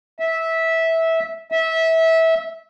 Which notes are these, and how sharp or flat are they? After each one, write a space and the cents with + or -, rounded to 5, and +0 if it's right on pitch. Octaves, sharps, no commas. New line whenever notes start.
E5 -15
E5 -20